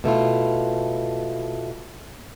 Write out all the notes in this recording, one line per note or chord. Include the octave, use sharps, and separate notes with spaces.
B2 A3 E4 F4